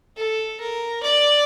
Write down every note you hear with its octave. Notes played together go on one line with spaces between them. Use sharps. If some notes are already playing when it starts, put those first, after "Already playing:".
A4
A#4
D5